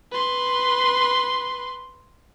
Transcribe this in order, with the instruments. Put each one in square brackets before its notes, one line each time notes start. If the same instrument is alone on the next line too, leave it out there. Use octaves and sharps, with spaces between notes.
[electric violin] B4 C6